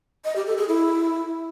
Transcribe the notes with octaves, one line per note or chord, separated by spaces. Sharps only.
D#5
G4
A4
G#4
E4